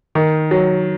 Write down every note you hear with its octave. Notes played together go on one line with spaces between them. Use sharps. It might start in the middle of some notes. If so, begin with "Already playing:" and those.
D#3
F#3